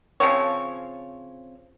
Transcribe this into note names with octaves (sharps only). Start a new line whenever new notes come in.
C#3 F3 C4 C#5